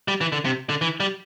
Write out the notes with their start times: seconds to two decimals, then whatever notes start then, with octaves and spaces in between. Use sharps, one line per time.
0.08 G3
0.21 E3
0.32 D3
0.45 C3
0.69 D3
0.81 E3
1.00 G3